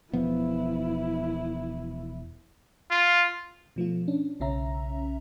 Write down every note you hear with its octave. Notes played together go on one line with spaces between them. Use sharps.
E1 F3 B3 E4
F4
B2 F3 A3 F4
C#4 D4
B1 C#3 C#4 E5 A#5